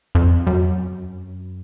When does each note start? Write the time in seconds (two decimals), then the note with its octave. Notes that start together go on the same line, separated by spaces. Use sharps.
0.15 F2
0.47 F#2